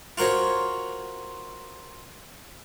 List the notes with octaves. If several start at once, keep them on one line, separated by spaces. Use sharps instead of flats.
F4 F#4 A#4 C5 C#5